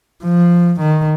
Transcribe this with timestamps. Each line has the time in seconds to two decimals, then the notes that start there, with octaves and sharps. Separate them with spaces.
0.23 F3
0.80 D#3